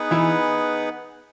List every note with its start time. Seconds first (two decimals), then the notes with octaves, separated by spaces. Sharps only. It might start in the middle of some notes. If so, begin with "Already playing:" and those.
Already playing: B3 D#4 G#4 B4 F#5
0.11 E3 E4